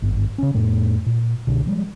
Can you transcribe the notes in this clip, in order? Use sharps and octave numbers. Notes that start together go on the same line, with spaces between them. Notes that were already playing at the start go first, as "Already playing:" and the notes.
G#1 G2
C#3 C#4
F2 A2 A3
A#2
C2 B2 D3 D4
F3 G3 G#3